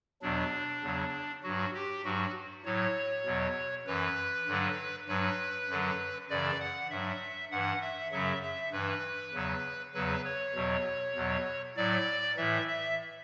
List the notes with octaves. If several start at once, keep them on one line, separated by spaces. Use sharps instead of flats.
E2 B2 F#3 D4
E2 C#3 F#3
G2 F#3 F#4
G4
G2 F#3 F#4
A2 F#3 C#5
E2 B2 F#3
F#2 E3 B4
G2 D3 F#3
G2 F#3 B4
F#2 D3 F#3
F#2 C#3 E3 D5
F#5
G2 F#3 E5
G2 E3 F#5
E5
F#2 C#3 F#3 E5
E5
G2 E3 B4
E2 C#3 F#3
E2 C#3 F#3 B4
C#5
E2 B2 F#3
E2 B2 F#3
A2 F#3 D5
A2 E3 E5
E5